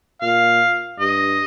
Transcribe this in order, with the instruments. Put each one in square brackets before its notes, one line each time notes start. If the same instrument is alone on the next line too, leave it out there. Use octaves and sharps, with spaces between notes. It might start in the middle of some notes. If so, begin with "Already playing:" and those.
[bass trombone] A#2 [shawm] F5
[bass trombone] G2 [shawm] D#5